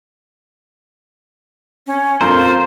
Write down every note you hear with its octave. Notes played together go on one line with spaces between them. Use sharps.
C#4
F2 F4 A4 A#4 C5